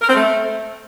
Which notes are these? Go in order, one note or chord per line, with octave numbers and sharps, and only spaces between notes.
A#4
C4
A3